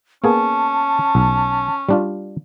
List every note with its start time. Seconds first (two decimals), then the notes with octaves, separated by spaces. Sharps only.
0.24 A#3 B3 C#4 G#4 A5
1.15 B1
1.89 G3 D4 F4